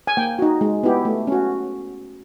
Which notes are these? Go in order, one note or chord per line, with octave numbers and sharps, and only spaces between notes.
G#5
A#3 G5
D#4 F#4
G#3
B3 E4 G4
A3
C#4 F#4